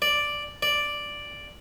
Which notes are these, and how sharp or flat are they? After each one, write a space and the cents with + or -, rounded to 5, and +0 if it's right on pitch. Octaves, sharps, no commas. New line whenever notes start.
D5 +0
D5 +0